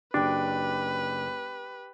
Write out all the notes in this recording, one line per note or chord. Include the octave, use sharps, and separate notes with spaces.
F#1 D4 G4 B4 G5 D6